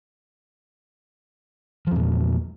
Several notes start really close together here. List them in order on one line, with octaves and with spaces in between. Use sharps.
F3 E2 A#2